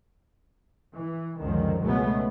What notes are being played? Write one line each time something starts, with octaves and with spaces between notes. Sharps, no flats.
E3
C#2 F#2 D3 D#3 F3
C#2 B2 F#3 G#3 A3 B3